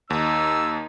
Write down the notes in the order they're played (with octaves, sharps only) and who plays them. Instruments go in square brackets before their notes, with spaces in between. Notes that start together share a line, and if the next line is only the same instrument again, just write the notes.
[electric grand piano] D#2 [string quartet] D#4 [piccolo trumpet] E6